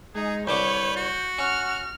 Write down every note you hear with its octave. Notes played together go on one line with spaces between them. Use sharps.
G#3 D#4 G#4
C2 D3 B4 C#5 D6 G6
F#4
C#4 F#5 F6